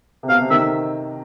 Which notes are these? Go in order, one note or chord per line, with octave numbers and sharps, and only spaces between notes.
C3
B2 F5
C3
D#3 E5